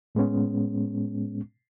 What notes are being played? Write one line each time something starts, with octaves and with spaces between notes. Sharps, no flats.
A2 G#3 B3 C#4